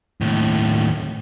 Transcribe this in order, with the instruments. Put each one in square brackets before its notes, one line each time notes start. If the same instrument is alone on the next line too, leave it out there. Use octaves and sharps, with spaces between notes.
[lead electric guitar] D#2 A2